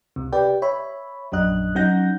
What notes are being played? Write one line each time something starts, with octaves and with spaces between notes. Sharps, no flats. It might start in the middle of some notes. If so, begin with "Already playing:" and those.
C#2 C3
G4 B4 D5 G5
C#5 E5 B5
A#1 F#2 D4 D#5 F#6
F#3 C#4 D#4 F#5 G6 A#6